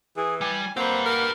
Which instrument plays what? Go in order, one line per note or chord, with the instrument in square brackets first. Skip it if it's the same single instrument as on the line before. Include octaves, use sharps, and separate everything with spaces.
[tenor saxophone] E3 [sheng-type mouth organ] G#4
[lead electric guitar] G3 [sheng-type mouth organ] G#5
[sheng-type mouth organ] A#3 F#5 [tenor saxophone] C4 [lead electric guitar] G4 B4
[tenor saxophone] A#4